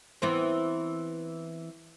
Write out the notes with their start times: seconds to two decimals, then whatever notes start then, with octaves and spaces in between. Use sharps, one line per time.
0.22 E3 B3 C4